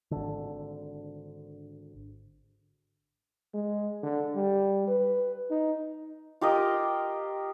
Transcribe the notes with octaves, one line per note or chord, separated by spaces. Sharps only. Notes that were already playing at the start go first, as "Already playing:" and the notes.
G#1 D3
G#3
D3
G3
B4
D#4
F4 G4 A#4 D#5